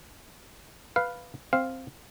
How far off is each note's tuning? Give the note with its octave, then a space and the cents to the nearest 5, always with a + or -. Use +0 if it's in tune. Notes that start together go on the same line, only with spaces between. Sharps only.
B4 +0 F5 +0
C4 +0 F5 +0